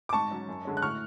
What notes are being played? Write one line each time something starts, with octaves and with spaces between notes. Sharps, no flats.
D6
G#2 A5 C#6
F#3 C#4
F#2
D3 G#3 C#4
F#6
A2 C#6 F6